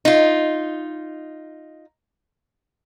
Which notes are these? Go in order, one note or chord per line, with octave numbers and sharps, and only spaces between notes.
D#4 F4